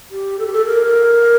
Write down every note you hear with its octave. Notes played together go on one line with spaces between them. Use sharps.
G4
A4
G4
A4
A#4